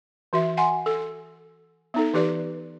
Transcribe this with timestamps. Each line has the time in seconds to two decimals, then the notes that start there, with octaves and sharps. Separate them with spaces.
0.33 E3 F#4 E5
0.57 F#5 G#5 C6
0.86 A4
1.94 B3 D#4 A4
2.14 E3 G4 B4 D5